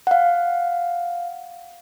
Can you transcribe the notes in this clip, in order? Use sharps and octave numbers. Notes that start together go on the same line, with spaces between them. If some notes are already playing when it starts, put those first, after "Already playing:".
F5 F#5